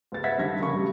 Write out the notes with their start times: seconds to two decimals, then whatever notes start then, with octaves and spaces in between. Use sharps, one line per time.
0.12 C#2 B3 A6
0.24 B4 C5 E5 F#5 G#6 B6
0.38 G2 D3 D#3 G#6 A#6
0.60 A#1 C#3 C#4 A#4 B5 C#6
0.74 G2 F#3 G3 A3